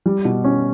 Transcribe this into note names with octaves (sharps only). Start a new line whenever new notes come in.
G3
B2
C#4